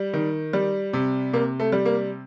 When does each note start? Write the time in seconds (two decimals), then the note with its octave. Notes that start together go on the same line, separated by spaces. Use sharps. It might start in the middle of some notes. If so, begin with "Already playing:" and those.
Already playing: G3
0.14 D#3
0.53 G3
0.93 C3
1.33 C3 A#3
1.60 A3
1.72 G3
1.85 A#3